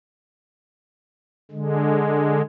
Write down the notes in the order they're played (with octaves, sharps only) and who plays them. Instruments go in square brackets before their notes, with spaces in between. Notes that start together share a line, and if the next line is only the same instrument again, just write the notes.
[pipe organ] D3 G#3